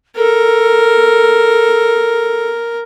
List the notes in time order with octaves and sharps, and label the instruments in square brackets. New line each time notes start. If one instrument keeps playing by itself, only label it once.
[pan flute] A4 [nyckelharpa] A#4